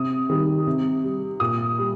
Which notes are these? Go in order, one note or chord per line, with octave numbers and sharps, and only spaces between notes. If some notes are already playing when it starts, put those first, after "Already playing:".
Already playing: C3 D#6
D#3 G3
C3
G3
A#2 D#6
G3